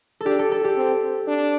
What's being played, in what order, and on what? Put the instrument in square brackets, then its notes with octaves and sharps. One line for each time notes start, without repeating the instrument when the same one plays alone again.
[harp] A4
[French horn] D4 [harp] G4
[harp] A4
A4
G4
[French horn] C4
D4